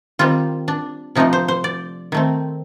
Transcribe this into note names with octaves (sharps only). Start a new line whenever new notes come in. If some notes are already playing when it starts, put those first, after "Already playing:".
D#3 G3 C4 F4
D4
C3 F3 A3 D4 D#4
C5
C5
D5
D#3 A3 C4